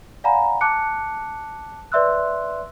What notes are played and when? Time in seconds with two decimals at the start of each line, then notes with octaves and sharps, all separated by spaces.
0.24 D5 F5 F#5 G#5 A#5 B5
0.61 A5 D6 F#6 C#7
1.92 B4 D5 E5 C6 E6 F#6